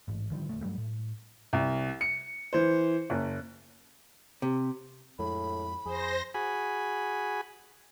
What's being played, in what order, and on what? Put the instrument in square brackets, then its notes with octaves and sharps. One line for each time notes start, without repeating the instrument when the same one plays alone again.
[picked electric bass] A1 G#2
D3 D#3 F3 G3
D#1 D2 A3
G2 F#3 G3 A3
A2
[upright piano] C2
C#7
E3 C5
F#1
[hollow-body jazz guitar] C3
[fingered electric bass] F2 G#3 [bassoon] A2 [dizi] B5
[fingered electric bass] F2 [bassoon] G#4 [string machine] C5 A#6
[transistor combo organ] F#4 G#4 G#5 B5